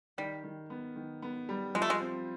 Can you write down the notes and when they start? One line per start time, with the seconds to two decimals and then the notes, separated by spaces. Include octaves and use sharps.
0.18 D#3 G3
0.44 D#3
0.70 B3
0.96 D#3
1.22 B3
1.49 G3
1.75 F3 G#3
1.82 A3
1.90 G#3
2.00 C4